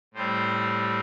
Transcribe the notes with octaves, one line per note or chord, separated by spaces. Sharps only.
A2 G3 C4 C5